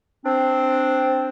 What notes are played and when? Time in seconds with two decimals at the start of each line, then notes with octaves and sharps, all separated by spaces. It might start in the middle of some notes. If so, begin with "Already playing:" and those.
0.25 C4 D4